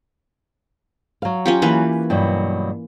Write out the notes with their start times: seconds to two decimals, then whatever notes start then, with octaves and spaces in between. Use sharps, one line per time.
1.22 F#3 F5
1.45 C#4 F4 G4
1.62 E3 A#3 B4
2.10 G2 B2 F#3